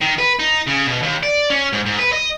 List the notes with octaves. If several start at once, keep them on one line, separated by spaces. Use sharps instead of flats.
D#3
B4
D#4
C#3
B2
D#2
D5
C#4
G#2
G#2
B4
D#5